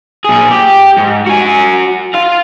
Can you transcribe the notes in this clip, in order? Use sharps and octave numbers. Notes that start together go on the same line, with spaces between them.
A#2 G#4
G4
G#2
F#4 G#5
F4 F5